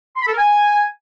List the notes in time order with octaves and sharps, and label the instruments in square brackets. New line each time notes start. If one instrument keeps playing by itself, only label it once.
[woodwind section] C6
B5
A4
A#4
G#5